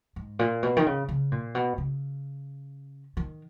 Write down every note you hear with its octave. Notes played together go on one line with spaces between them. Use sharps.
G#2
A#2
B2
D#3
C#3
C#3
A#2
B2
C#3
D#3